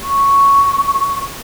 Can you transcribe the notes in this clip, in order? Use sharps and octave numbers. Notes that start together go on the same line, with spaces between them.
C#6